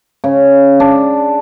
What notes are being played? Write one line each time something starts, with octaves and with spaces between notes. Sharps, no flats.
C#3
D4